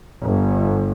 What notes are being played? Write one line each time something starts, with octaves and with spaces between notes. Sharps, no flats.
G1